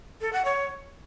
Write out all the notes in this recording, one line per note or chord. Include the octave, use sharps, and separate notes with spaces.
A4
F#5
C#5